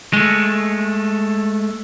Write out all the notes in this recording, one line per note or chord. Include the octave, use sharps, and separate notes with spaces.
G#3 A3